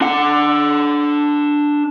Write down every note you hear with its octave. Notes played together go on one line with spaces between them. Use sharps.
D4 F#5